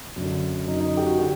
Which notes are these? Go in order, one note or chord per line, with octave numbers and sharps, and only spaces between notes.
F#2 D3
F#2 D3 D#4
D#4
G4
F#4
D3 G4